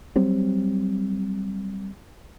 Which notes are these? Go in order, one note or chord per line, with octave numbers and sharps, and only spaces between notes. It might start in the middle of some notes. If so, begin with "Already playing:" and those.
F#3 G3 C4